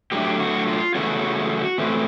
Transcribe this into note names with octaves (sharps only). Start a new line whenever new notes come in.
A2 F#3 A3 D4 G4
F#4
F4
C#3 E3 A3 C#4 F#4
A2 E3 A3 C4